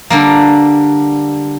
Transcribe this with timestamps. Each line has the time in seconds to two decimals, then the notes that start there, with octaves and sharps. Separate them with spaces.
0.10 D3 G3 A#3